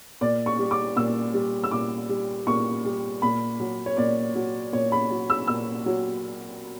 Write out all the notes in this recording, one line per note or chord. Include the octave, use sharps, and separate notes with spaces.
A#2 D5
C#6
G3
D6
A#2 E6
G3
E6
A#2 D6
G3
A#2 C#6
G3
A#2 B5
F#3
C#5
A#2 D5
F#3
A#2 C#5
B5
F#3
E6
A#2 E6
F#3